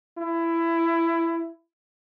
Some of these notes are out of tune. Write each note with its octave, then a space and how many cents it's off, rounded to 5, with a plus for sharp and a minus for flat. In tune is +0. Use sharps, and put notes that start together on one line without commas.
E4 +15